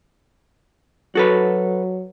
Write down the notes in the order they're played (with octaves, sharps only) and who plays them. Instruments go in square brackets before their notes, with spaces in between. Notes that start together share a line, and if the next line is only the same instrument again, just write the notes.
[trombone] F#3 [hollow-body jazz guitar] F#4 A4 B4